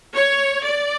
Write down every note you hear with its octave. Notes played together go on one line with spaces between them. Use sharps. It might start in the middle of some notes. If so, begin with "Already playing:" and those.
C#5
D5